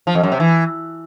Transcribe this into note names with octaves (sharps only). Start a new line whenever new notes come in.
F3
F2
F#2
C3
E3